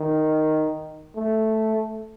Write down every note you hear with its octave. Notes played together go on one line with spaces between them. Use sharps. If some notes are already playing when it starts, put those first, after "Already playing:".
Already playing: D#3
A3